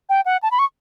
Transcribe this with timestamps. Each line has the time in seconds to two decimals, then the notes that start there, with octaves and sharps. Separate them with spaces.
0.09 G5
0.25 F#5
0.42 A5
0.51 B5
0.59 C#6